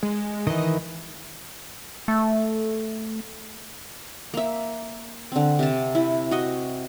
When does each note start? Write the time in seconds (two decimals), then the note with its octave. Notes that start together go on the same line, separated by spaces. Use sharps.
0.03 G#3
0.47 D#3 E3 D#5
2.08 A3
4.34 A#3 E5
5.32 D3 C4
5.59 C3 A5
5.95 E4
6.31 F#4 D#5